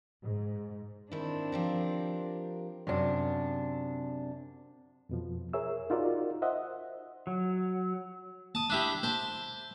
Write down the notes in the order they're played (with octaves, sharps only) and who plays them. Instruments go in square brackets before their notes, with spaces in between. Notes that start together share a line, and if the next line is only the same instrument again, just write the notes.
[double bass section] G#2
[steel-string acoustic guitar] D#3 E4 [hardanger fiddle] C4 D4
[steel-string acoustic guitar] F3 G4 A#4
F#2 C3 D4
[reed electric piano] F2 B2 F3
G#4 A#4 C#5 E5 E6
D#4 F4 F#4 A#4 D5
C5 D#5 E5 F#5
[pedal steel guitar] F#3
[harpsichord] A5 D#6
D4 E4 G4
C5 A5